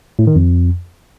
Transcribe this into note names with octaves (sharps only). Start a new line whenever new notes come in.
A2
D#3
F2